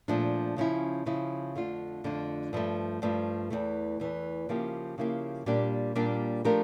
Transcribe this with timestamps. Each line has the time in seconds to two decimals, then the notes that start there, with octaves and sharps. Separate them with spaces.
0.08 A#2 F3 A3 D4
0.56 C#3 F3 C#4 E4
1.05 C#3 F3 C#4 E4
1.55 F2 D3 A3 D4 F4
2.04 F2 D3 A3 D4 F4
2.53 G2 F3 A3
3.02 G2 F3 A3
3.50 E2 E3 A3
4.00 E2 E3 A3
4.49 C#3 F3 A#3 E4 G4
4.98 C#3 F3 A#3 E4 G4
5.46 A#2 G3 A#3 D4 G4
5.95 A#2 G3 A#3 D4 G4
6.45 F3 A3 D4 G4 A#4